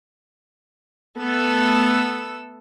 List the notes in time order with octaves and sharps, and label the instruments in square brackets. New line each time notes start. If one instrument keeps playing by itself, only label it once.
[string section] A3 B3 A4 E6